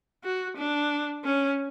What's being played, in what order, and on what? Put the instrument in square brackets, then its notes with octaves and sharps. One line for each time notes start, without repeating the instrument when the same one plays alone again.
[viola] F#4
D4
C#4